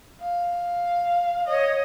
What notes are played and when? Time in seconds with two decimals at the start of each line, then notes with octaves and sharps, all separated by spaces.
0.21 F5
1.48 C#5 D#5